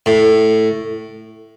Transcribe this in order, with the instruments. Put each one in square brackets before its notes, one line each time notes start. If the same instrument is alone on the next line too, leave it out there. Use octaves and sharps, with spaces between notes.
[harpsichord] A2